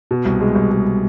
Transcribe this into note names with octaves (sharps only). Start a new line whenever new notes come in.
B2
C2
G#3
C2
G#3